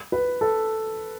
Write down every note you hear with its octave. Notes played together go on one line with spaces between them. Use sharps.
B4
A4